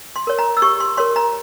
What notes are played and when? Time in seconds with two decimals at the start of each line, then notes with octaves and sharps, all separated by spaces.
0.16 C6
0.27 A#4 C#5
0.39 A#5
0.57 E6
0.62 G4 C#6
0.80 C6
0.97 A#4 C#5 C6
1.16 A#5